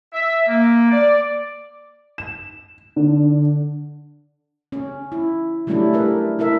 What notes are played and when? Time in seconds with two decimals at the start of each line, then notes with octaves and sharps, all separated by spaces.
0.13 E5
0.48 A#3
0.91 D5
2.18 E7
2.96 D3
4.72 C#4
5.12 E4
5.67 F#3 G3 A3 C#4 D4 E4
5.93 G3 A#4 B4
6.39 E4 A4 A#4 E5